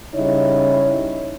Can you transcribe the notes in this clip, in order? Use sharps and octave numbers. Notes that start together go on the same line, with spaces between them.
C#3 G3 D#4 E4 C#5